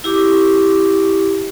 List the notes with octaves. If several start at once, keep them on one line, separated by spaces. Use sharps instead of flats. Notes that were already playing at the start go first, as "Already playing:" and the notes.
E4 G4 D6